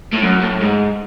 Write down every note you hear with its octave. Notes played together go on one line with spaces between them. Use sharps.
A2
F#2
A2
G#2